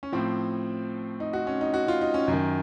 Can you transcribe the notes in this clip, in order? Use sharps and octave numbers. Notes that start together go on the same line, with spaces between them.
C#4
A2 F3 C4
D#4
F#4
C#4
D#4
F#4
F4
D#4
C#4
F#2 D#3